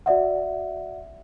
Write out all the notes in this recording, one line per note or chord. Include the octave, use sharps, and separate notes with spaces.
F#4 D5 E5 F#5